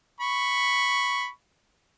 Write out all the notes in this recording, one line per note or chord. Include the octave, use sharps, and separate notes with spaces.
B5 C#6